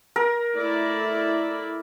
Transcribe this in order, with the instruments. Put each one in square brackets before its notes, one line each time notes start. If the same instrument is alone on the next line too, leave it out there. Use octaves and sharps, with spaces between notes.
[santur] A#4
[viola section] A3 E4 D5